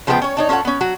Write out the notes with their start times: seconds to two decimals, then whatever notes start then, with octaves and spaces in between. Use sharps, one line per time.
0.07 C#3 F3 G#3 B3 A4 G5
0.22 C#4 C#5
0.37 D4 D#4 C#5
0.49 C#4 F4 A4 C#5 F#5
0.65 B3 C#4
0.81 F#3 F#4